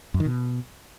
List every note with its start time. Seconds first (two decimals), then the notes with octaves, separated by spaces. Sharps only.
0.14 F#2
0.20 D#3
0.26 B2